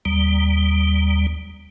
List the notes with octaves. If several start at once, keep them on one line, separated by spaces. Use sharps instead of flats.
D#2 G3